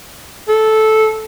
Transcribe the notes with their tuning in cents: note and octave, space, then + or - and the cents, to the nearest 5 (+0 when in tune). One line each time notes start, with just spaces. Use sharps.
A4 -10